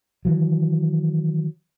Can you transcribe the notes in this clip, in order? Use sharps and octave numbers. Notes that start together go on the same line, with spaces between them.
D#3 E3 F#3